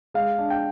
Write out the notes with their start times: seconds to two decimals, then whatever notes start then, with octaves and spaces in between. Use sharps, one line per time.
0.14 G#3 F5
0.38 D4
0.50 G5